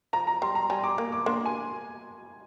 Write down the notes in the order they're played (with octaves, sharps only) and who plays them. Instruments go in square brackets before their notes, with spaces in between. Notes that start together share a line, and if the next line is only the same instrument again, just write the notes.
[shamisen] F3 [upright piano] A#5
[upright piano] A#5
[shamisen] G3 [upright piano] C6
[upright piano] A#5
[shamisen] G3 [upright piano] G#5
[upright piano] D6
[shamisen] A#3
[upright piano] D6
[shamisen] A#3 D4 [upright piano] C6
[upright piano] G#5